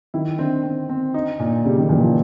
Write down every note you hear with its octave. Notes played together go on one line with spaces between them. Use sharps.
D#3 E4
D3 C4
C4
C4
D#4
A#2
C#3 G3
D#3
A#2 E3
F3